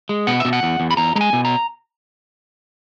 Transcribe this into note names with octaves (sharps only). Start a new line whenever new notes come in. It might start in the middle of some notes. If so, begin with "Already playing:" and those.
G#3
B2 F#5
B2 E5
F#5
E2
E2
B5
E2 A#5
G#3 A#5
G#5
B2
A#5